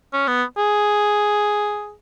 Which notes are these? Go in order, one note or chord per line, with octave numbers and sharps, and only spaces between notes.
C#4
B3
G#4